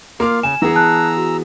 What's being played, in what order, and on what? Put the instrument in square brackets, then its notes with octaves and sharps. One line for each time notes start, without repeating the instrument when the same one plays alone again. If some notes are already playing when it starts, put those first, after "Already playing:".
[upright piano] A#3 D6 F6 [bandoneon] F4 F5
[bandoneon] C#3 [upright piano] G#5 [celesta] E7
[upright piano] E3 B3 G#4 [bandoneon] A#5 E6
[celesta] A5 F#6
F#4